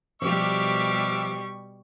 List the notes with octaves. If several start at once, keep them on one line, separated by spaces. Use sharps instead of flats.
B2 F3 G3 G4 E5 C#6 D6 F6